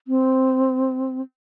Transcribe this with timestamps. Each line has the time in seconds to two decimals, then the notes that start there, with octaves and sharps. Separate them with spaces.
0.08 C4